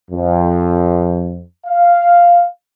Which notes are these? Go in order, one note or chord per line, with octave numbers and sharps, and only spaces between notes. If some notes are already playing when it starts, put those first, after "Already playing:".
F2
F5